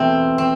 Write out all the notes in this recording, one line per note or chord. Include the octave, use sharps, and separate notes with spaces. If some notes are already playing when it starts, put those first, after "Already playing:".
Already playing: E2 B2 A3 C4 E4
C4